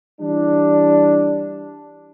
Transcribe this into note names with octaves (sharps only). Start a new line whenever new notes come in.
E3 G3 D4